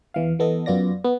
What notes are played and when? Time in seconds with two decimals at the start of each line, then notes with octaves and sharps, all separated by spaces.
0.14 E2 E3 F5
0.39 E3 B3 A4 D#5
0.66 F#2 B3 F4 D5 A#6
1.04 B3